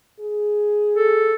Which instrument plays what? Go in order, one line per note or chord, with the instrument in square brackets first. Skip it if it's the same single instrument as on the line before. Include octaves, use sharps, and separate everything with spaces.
[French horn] G#4
[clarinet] A4